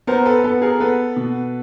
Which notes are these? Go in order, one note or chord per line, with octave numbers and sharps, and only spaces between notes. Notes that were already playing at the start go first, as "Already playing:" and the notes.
B3 A#4 C5
A4 B4
B3 A4 B4
G#4 A#4
B3 A4 B4
B2